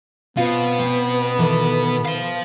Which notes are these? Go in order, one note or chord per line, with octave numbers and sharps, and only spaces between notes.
B2 B3 C4 F4 F5
C4
D#3 E3 A4
C5 F5